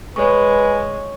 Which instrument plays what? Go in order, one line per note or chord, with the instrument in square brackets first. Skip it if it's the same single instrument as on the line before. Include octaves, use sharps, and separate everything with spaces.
[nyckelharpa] G#3 [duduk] B4 [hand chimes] C#5 C#6